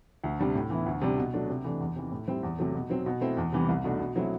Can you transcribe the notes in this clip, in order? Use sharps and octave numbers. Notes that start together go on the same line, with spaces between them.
D2
C3 G3 D4
A2
E3 B3 E4
D2
C3 G3 D4
B2
F#3 A3 D4
C3
E3 A3 D4
E2
C3 E3
A2
G3 C4 E4
E2
C3 F#3 A3
B2
F#3 C4
B2
A3 C4 E4
E2
C3 E3 G3 B3
C2
B2 A3 D4
B2
F#3 A3 C4 E4